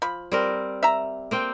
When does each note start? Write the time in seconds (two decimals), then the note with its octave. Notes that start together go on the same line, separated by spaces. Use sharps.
0.02 F3 B5
0.31 G3 C4 A#4
0.83 E5 A#5
1.31 A#3 C4 G5